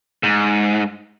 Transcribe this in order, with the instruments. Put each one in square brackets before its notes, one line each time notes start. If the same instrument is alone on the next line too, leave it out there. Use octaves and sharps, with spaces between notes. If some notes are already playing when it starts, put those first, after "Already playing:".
[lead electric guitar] G#2